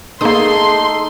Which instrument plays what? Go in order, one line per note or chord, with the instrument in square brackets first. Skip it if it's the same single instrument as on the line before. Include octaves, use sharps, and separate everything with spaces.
[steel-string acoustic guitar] A3 D#4 A4 [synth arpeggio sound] A#3 D#6 [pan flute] G#4 [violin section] C6